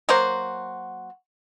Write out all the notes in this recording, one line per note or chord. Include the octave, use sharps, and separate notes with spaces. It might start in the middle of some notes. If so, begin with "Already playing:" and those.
F#3 A#3 F#4 C5